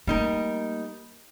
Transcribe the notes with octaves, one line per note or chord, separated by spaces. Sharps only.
G3 A3 A#3 D#4 A#4